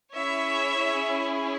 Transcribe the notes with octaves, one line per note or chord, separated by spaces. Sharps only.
C#4 E4 G#4 C#5 E5